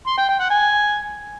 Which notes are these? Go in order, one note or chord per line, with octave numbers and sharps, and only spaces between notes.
C6
G5
G5
F#5
G#5